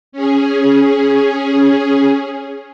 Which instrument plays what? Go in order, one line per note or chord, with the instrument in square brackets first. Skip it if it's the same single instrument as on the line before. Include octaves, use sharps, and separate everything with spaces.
[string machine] C#4 G#4